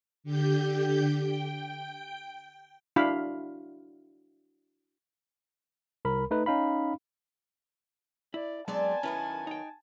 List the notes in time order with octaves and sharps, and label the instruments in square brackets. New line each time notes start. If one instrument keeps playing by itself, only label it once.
[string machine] D3 G4 G6
G5
[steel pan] D4 E4 F#4 F5 B5
[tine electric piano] C2 A#4 B5
A3 D#4 B4
C#4 D#4 F5 B5
[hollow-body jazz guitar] E4 [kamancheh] D5
[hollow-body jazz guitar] F#3 G#3 D4 [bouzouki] B3 C4 D5 [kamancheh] G#5 A5
[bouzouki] D#3 F#3 B3 [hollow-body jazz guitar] C#4 E4 B4
[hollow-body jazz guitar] D#4 G5